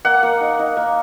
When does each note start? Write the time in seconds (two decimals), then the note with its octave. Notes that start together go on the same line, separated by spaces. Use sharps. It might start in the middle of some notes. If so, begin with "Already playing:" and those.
0.05 A#3 F#5
0.23 A#3
0.41 D#4
0.59 D#4
0.77 A#3